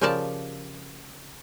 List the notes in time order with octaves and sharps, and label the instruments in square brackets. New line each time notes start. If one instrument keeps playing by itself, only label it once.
[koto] C#3 F3 G4 A#4 D5 A5